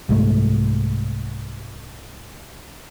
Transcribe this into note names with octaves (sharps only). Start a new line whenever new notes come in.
C2 G#2 A3